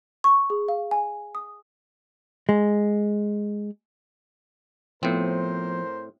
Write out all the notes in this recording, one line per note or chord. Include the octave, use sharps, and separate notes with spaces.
C#6
G#4
F5
G#5
D#6
G#3
A2 F3 B3 C4 A#4 C5